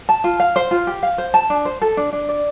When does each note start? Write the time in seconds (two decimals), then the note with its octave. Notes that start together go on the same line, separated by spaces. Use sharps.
0.09 A5
0.24 F4
0.40 F5
0.56 C5
0.71 F4
0.87 G4
1.03 F5
1.18 C5
1.34 A5
1.50 D4
1.65 C5
1.82 A4
1.97 D4
2.13 D4
2.29 D5